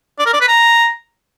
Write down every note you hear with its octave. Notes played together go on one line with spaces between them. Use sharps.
D5
A#4
D5
B4
A#5